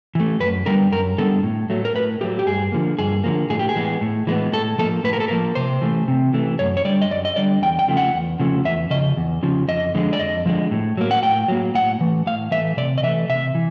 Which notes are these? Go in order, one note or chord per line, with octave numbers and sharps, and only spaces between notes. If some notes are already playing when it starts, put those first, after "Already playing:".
E3 A3
F#2 B4
D3 G3 B3 A#4
F#2 A#4
D3 G3 B3 A4
A2
F#3 A3
A#4
A2 B4
F#3 A3 G4
G4
G2 G#4
D3 F3 A#3
G2 G#4
D3 F3 A#3
A2 G#4
G4
G#4
E3 G#3 B3
A2
E3 G#3 B3
A2 A4
F3 A#3 A4
A2 B4
A#4
A4
F3 A#3 A#4
C3 C5
E3 A3
C3
E3 A3
F#2 C#5
C#5
D3 G3 D5
D#5
F#2 D5
D#5
D3 G3 D5
E2 G5
G5
C#3 F3 A3
F#5
E2
C#3 F3 A3
E2 E5
C#3 D#5
F3
E2
C#3 F3
F2 D#5
D3 F3 G#3
D5
F2 D#5
D3 F3 G#3
A2
F#3 A#3
F#5
A2 G5
F#3 A#3
A2 F#5
E3 A3
A2 F5
E3 A3 E5
C3 D5
D#5
E3 A3 E5
C3 E5
E3